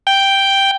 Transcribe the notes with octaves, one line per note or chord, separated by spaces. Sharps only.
G5